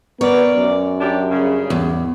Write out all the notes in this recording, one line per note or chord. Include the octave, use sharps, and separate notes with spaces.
B3 A#4 C#5 D5
F#2
F#3 D4 G4
G2 C#3
E2